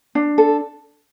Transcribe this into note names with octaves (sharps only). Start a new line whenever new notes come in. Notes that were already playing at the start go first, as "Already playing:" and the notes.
D4
A4